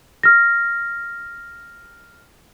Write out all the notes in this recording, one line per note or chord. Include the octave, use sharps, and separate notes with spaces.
F6 A#6